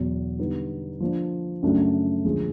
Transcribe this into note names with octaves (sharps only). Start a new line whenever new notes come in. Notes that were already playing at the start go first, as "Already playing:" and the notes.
Already playing: E2 B2 F#3
D3 G3 B3 D#4
F3 A#3 D4
F#2 C#3 F#3 A3 D4
D#2 D3 F3 G#3